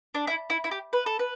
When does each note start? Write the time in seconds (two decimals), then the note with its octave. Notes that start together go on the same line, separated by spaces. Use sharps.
0.14 D4
0.27 E4
0.50 E4
0.64 E4
0.71 G4
0.93 B4
1.06 A4
1.19 B4